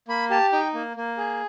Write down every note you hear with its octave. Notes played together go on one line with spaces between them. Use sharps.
A#3 B5
G4 A5
D#4 G5
A#3
A#3
G#4